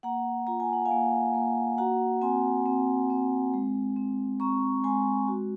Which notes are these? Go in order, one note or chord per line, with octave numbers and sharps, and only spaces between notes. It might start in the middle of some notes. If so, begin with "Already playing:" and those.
A#3 F#5 A#5
F4 A#5
G#5
F#5
F5 G#5
A#3
A#3
F#4 F#5 A#5
C4 G#5 C6
C4
C4
G#3
C4
C4 A#5 C#6
G#3 G#5 C6
F#4